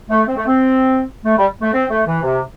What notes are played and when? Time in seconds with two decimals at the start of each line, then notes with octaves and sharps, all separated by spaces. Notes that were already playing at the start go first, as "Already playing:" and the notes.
0.10 A3
0.27 C4
0.36 A3
0.46 C4
1.25 A3
1.37 G3
1.61 A3
1.73 C4
1.90 A3
2.07 E3
2.22 C3